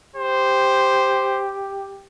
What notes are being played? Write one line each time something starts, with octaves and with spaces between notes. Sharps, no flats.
G4 C5